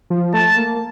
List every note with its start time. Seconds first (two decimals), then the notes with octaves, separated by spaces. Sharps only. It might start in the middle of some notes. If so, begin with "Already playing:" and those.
0.10 F3
0.34 A3 A5
0.57 A#3